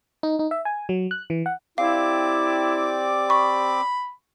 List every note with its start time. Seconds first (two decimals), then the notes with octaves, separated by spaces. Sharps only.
0.23 D#4
0.39 D#4
0.51 E5
0.65 G#5
0.89 F#3
1.11 F#6
1.30 E3
1.46 F#5
1.78 C4 E4 G4 D5 F5 D6
3.30 B5 C#6